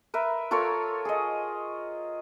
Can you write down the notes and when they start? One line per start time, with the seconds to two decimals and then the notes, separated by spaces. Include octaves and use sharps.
0.14 A#4 B4 E5
0.51 F4 A4 A#4 C#5
1.05 G#4 D#5